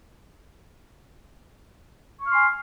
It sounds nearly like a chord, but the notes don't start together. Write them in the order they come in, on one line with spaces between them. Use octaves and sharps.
C#6 F6 C6 G#5